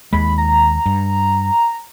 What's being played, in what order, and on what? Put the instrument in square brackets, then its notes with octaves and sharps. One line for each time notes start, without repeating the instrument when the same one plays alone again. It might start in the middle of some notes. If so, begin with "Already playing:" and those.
[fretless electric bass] D#2 G#3 [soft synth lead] B5
[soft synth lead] A#5
[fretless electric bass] G2